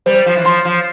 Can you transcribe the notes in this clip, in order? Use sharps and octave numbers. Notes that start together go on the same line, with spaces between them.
G3 C5
F3
E3
F3 C6
F3